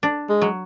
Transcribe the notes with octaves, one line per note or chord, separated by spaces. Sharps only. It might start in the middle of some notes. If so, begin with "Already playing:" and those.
D4
G#3
F#3